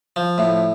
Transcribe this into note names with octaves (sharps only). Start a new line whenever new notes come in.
F3
A2